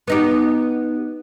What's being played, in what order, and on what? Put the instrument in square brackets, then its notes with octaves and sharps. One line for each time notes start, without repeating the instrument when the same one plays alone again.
[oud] B3 D#4 G4